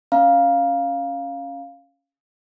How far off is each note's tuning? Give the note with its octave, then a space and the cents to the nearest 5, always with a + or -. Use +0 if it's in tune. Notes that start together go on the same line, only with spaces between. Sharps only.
C#4 +0 F5 +0 A#5 +30